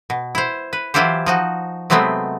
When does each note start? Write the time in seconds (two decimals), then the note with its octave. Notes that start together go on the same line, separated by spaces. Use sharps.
0.10 B2
0.35 E4 C5
0.73 B4
0.94 E3 F#3 E4 F4 G4 C5
1.26 F3 D#4 F#4
1.90 C3 F#3 G#3 A3 B3 C4